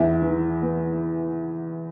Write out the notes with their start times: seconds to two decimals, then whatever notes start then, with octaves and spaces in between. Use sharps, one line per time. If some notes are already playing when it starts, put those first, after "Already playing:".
Already playing: E2 E4
0.22 E3
0.62 B3